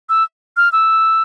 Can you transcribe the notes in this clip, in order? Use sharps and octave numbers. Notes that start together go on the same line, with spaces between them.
E6
F6
E6